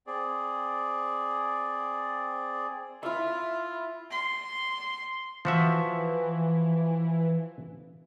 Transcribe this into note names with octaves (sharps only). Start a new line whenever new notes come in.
C4 G#4 D5
E4 F4 E5
C6
E3 F3 F#4 E5